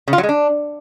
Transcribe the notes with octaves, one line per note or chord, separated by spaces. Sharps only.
C#3
F4
F#3
G#3
D4